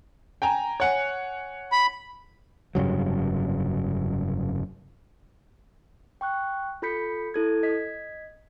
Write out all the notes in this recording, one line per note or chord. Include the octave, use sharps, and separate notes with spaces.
G5 G#5 A#5
C#5 F#5 G#5
B5
F1 G2 C#3 F#3
G5 C#6 F#6
F4 A4 B5 G6 B6 C#7
E4 A4 G#6
D#5 G#6 B6